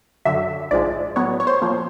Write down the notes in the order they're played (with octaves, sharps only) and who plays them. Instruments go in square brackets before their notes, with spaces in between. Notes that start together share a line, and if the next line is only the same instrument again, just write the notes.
[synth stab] F#2 D3 F#3 E5
A#1 G#2 F3 G#3 D5
A2 F#3 B3 C#5
C#5
C5
C#5
A#2 F3 A#3